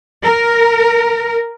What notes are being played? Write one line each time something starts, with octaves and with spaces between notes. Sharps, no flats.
A#4